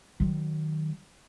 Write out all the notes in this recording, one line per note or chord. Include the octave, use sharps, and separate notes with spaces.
D#3 F#3